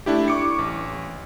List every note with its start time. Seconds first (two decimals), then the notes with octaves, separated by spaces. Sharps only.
0.06 A3 D4 E4 G4
0.28 C#6 D6 C#7
0.59 A1